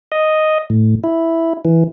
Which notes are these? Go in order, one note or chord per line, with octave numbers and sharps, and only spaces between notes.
D#5
A2
E4
E3